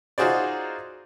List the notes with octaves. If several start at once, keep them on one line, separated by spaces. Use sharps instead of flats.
D#4 F4 F#4 G#4 C5 D5